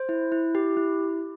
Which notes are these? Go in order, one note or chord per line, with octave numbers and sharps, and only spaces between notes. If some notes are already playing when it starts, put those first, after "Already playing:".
Already playing: C5
E4
E4
G4
E4